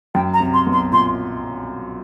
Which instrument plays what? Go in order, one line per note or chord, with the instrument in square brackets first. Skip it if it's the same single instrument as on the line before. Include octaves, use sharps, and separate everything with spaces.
[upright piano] F#2 [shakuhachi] G5
[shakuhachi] A#5
[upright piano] C2 C3
[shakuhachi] C6
[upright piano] B1 B2
[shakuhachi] C6
[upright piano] A#2 [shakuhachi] C6